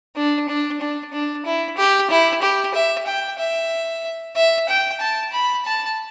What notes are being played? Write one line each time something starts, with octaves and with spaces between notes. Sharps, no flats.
D4
D4
D4
D4
E4
G4
E4
G4
E5
G5
E5
E5
G5
A5
B5
A5